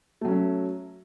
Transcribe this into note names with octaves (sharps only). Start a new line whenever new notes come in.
F#3 A3 C#4